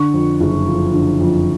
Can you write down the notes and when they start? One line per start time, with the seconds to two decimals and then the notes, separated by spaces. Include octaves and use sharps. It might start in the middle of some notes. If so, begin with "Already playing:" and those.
Already playing: D3 C#6
0.13 F2
0.40 F#1
0.67 F3
0.94 D3
1.20 F2